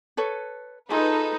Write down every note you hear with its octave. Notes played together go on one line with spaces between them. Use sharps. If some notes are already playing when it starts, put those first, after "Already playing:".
A4 B4 C#5
D#4 F4 G#4 A4 B4